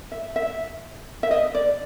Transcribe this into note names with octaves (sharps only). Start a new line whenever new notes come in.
E5
E5
E5
D#5
D5